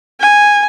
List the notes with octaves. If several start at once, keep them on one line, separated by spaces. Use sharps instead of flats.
G#5